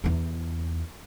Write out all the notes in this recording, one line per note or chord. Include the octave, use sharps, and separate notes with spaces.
E2 E4